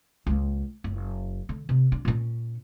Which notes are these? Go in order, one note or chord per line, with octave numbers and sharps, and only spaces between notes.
C#2 A#3
F#1
D3
C3
D4
A#2 C#4